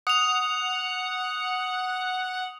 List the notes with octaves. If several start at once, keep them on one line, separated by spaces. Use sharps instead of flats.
F#5 D#6 F7